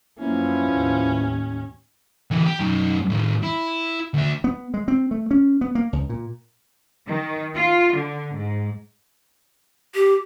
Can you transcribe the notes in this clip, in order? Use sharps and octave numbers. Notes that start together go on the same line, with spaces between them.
F#2 F3 A#3 B3 C#4 E4
D#2 A2
D3 E3
G4
F#2 D#4
A2 D#3
E4
D2 E5
B3
G#3
C4
A3
C#4
B3
A#3
C#2
A#2
D#3
F4
D3
G#2
G4